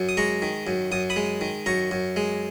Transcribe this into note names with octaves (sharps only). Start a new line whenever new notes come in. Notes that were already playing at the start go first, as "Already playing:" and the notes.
Already playing: F#2
D#6
G#3 A#5 C#6
D#3
F#2
F#2 D#6
B5 D#6
G#3
D#3
F#2 A#5 C#6
F#2
G#3